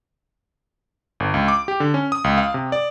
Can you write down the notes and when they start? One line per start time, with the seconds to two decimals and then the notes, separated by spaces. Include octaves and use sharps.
1.20 G1
1.34 C#2
1.48 D6
1.68 G4
1.80 D3
1.94 C#4
2.12 D#6
2.24 C#2
2.38 F5
2.54 C3
2.72 D5